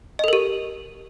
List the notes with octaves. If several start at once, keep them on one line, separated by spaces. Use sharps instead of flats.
G4 A4 A#4 D#5